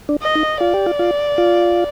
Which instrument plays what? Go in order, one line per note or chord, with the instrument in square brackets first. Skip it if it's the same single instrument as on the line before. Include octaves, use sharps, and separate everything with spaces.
[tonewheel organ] D4
[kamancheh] D#5
[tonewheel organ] D#4
[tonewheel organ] F4 [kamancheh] D5
[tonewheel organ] G4
F4
F4
F4